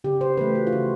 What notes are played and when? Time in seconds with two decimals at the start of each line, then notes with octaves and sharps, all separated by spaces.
0.04 C#3 G4
0.21 C5
0.37 E3 A3 B4
0.55 F#4
0.67 F4
0.73 C#3 F#4